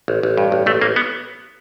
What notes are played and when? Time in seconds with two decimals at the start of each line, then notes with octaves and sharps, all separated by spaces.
0.08 A1
0.23 A1
0.37 G2
0.52 A1
0.66 A1 A3
0.81 A1 A#3
0.96 B3